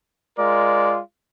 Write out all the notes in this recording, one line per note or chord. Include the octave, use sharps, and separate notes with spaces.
G#3 F4 A#4 D5